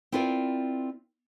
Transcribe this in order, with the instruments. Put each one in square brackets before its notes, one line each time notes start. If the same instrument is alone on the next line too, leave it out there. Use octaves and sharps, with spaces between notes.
[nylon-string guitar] C4 E4 F4 A#4 D5